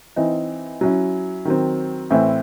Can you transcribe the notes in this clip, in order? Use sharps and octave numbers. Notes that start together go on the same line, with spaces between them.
E3 C4 D#4
F#3 C#4 E4
D#3 F#3 C4
A2 E3 C4 E4